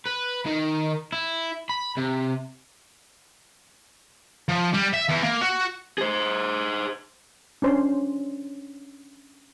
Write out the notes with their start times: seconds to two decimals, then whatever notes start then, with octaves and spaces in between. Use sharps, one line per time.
0.07 B4
0.46 D#3
1.12 E4
1.69 B5
1.97 C3
4.49 F3
4.74 G3
4.93 E5
5.09 E2
5.23 A#3
5.41 F#4
5.98 G#4 C5
7.62 C#4 D4 C5 C6